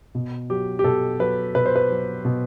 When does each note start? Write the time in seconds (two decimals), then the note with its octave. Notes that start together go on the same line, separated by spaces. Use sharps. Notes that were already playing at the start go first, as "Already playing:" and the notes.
0.15 B2
0.50 F#3 G4
0.79 G4
0.84 B2 A4
1.19 F#3 B4
1.55 B2 B4
1.66 C5
1.76 B4
1.91 F#3
2.25 B2